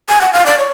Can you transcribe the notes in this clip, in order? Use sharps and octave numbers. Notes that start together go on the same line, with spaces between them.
G#5
F#5
F5
D5
C#5